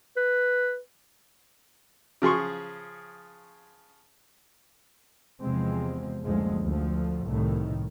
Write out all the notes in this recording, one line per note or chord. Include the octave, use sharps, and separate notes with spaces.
B4
C#3 F3 G#4 C6 C#6
E2 C3 F3 G#3 C4
F#1 D2 F3 G#3
D2 F3
C2 A2 D#3